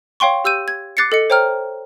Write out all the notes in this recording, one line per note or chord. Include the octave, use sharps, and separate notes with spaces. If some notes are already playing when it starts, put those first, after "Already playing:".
C#5 F5 G5 C6 C#6
G4 E6 G6 D#7
G#6
D6 F#6 A6 C7 C#7
A4 D#5 C#7
C5 C#5 G5 A#5 F6